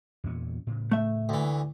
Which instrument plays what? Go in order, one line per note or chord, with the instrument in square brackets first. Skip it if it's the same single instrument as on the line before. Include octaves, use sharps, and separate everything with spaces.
[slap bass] E2 A#2 C#4
A2 C#3
[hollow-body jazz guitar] A3 E5
[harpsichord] D2 E3